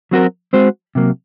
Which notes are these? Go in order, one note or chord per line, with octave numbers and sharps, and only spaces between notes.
F#3 C4 F#4 A#4
G#3 C4 F#4 C5
C3 F#3 A#3